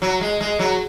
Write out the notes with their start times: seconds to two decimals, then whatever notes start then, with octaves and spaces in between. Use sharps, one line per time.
0.02 F#3
0.21 G#3
0.40 G#3
0.59 F#3